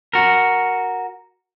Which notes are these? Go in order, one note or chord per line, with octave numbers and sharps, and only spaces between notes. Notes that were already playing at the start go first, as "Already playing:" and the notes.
F#4 A#4